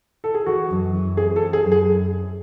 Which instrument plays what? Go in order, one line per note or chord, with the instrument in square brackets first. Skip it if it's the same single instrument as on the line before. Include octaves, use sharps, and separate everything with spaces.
[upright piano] A4
G#4
[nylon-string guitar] E3 [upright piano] F#4
[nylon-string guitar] F#2
E3
[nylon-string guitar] C4 [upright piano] G#4
[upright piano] A4
[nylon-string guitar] C4
[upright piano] G#4
[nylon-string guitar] F#2
[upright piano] G#4